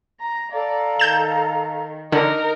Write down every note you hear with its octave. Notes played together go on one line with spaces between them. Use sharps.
A#5
A4 D5 F5 A#5
D#3 G6 E7
D3 D#4 A#4